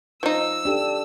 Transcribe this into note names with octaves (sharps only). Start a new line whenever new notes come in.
F3 D#4 E6
D4 G4 A4